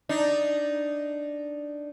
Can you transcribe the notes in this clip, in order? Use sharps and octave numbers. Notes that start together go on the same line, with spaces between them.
D4 D#4